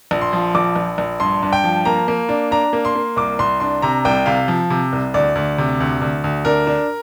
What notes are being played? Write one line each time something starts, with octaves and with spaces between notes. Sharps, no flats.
A#1
C6
F3
A#1 D6
A#1
A#1
G2 C6
G2
G5
F3
A#3 A#5
A#3
D4
D4 A#5
A#3
C6
A#3
C2 D6
C2 C6
D4 C6
C3 A#5
C2 G5
C3 F5
F3
C3
C2
D2 D5
D2
C3
D2
D2
D2
D4 A#4
D4